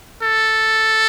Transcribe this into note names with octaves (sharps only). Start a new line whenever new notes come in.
A4